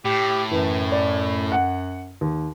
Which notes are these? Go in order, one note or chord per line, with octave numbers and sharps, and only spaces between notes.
A2 G4
F#2 E3
D5
F#5
D#2